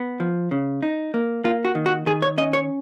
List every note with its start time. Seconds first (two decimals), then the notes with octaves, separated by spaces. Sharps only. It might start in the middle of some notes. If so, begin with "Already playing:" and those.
Already playing: B3
0.20 F3
0.51 C#3
0.82 D#4
1.14 A#3
1.44 A#3 F4
1.65 F#4
1.75 D#3
1.86 F#4
2.06 D#3 G#4
2.22 C#5
2.38 C#4 D#5
2.53 C#5